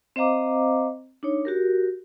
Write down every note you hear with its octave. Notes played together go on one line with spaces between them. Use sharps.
C4 C5 D#5 F5 A#5 D6
D4 D#4 C#5
F#4 G4 A#4